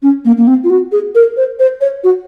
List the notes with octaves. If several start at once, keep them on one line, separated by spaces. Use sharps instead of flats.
C#4
A#3
A#3
C4
F4
F#4
G#4
A#4
C5
C5
C#5
F#4